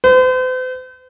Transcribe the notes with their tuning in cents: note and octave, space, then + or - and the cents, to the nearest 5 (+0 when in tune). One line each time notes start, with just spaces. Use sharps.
C5 -45